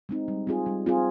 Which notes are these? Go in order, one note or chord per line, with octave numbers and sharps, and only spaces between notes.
G#3 C4 D#4
G3
C4 F4 G#4
G3
C4 F4 G#4